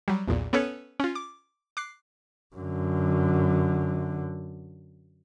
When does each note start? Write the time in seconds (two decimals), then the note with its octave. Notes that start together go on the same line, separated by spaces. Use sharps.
0.08 F#3 G3
0.28 B1 E2 A#2
0.53 B3 C#4 A4 B4 C#5
1.00 C#4 F4
1.15 D6
1.77 D6 F#6 C7
2.56 F#2 D3